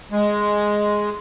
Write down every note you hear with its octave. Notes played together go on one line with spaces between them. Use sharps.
G#3